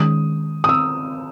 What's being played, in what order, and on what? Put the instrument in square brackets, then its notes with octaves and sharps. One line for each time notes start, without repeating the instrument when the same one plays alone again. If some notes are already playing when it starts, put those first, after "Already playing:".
Already playing: [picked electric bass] D#3 G#3 C#4 [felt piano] D#6
[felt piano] D#6
E6